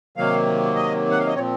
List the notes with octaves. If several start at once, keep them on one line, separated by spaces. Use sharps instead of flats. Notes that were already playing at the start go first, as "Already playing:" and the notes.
C3 D#3 F#3 A#3 F5
D#5
F#5
F5
D#5
A#2 F3 C4 C#5